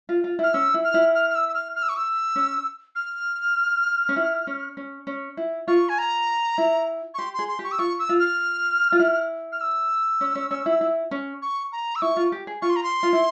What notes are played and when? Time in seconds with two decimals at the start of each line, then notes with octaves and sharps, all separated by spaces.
0.09 F4
0.24 F4
0.39 E4 F6
0.54 C#4 E6
0.74 E4
0.84 F6
0.94 E4
1.15 F6
1.30 F6
1.35 E6
1.49 E6
1.54 F6
1.76 F6
1.83 E6
1.89 C#6
1.97 E6
2.36 C#4
2.95 F6
4.09 C#4
4.16 E4
4.47 C#4
4.77 C#4
5.07 C#4
5.37 E4
5.68 F4 C#6
5.89 G#5
5.98 A#5
6.58 E4
7.14 C#6
7.18 G4 C6
7.34 G#4 C6
7.48 C6
7.59 G4
7.64 C#6
7.72 E6
7.79 F4 C#6
7.99 E6
8.09 F4
8.19 F6
8.92 F4
8.99 E4
9.52 F6
9.61 E6
10.21 C#4
10.35 C#4
10.51 C#4
10.66 E4
10.81 E4
11.11 C#4
11.42 C#6
11.72 A#5
11.96 E6
12.02 E4 C#6
12.17 F4
12.32 G4
12.47 G#4
12.62 F4 C#6
12.70 C6
12.76 A#5
12.83 C6
13.03 F4
13.13 E4